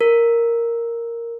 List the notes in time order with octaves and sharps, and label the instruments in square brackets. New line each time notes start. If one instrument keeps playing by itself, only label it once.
[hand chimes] A#4